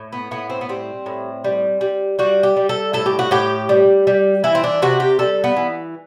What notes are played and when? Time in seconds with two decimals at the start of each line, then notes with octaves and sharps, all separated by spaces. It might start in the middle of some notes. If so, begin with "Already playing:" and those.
Already playing: A2
0.13 B3
0.31 A2 B3
0.50 C4
0.61 B3
0.69 G3 C4
1.06 A2
1.44 G3
1.81 G3
2.19 G3 F#4
2.43 G4
2.56 G3
2.69 A4
2.93 A2 A4
3.06 G4
3.19 F#4
3.31 A2 G4
3.69 G3
4.07 G3
4.44 E3 E4
4.55 C4
4.64 D4
4.82 C3 F#4
5.00 G4
5.19 G3 A4
5.44 B3
5.57 E3